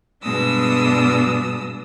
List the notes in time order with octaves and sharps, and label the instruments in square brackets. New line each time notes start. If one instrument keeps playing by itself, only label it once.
[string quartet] G2 B2 G#3 D4 D#6 E6